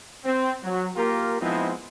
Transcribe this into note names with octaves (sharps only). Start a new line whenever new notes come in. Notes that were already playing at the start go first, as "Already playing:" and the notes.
C4
F#3
A#3 F4 G4 A#4
F3 G#3 B3 C4 D#4 E4